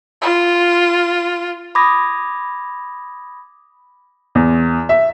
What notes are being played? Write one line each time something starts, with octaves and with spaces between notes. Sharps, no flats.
F4
B5 D6 D#6 G#6 A#6
E2
E5